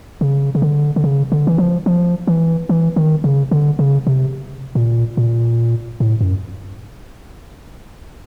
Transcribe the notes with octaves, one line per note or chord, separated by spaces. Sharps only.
C#3
C#3
D3
D3
C#3
D3
E3
F3
F3
E3
E3
D#3
C#3
D3
C#3
C3
A#2
A#2
A2
F#2